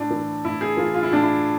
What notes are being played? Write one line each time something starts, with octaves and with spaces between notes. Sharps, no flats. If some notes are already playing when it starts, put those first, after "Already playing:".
Already playing: A2 D4
E3
A2 E4
G#4
E3 F4
F4
E4
A2 D4
E4